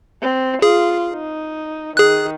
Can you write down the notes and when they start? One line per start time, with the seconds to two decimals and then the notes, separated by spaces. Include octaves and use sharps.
0.22 C4
0.62 F4 G#4
1.13 D#4
1.97 D#3 G#4 F#6